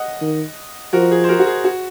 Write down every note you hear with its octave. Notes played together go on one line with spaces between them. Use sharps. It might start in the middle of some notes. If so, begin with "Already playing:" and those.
Already playing: D#5 F#5
D#3
F3 F#4 A#4
G#4
C5
F#4 A#4
F#4
G#4
F#4